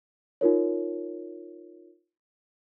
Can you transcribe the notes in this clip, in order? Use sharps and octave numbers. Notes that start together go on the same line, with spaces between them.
D#4 F4 A#4 C#5